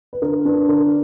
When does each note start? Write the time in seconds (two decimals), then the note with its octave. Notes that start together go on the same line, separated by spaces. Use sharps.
0.13 B4
0.22 D3 A#4
0.45 D4 B4
0.68 D3 A#4